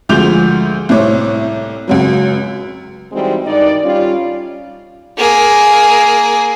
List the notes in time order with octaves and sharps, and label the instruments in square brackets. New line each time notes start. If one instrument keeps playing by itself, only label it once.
[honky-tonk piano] D2 F3 G#3 D6 G6 F7
C2 A2 A3 C4 C#5 D6
C#2 F#2 F#3
[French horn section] E3 G3 G#3 C4 D#4 F#4
G2 D#3 D#4 D5
G3 C#4 F4
[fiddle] A#3 G#4